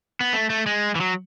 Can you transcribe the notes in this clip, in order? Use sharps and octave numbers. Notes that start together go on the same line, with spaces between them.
B3
A3
A3
G#3
E3
F#3